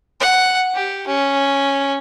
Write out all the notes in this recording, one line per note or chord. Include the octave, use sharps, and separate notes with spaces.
F#5
G4
C#4